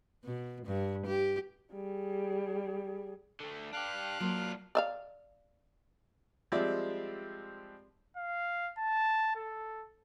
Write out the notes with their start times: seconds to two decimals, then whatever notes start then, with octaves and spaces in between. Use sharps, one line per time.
0.25 B2
0.66 G2
1.06 G4
1.72 G3 G#4
3.40 D3 A3
3.73 D4 G4 F5 F#6
4.20 F#3 A#3 D4 F4
4.75 D5 E5 F5
6.52 F3 G3 G#3 C4 D5 E5
8.17 F5
8.78 A5
9.35 A4